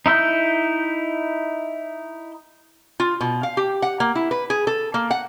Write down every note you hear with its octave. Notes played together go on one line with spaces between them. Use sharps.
D#4 E4 E6 G6
F4
B2
F5
G4
F#5
A#3
E4
B4
G#4
A4
A#3
F#5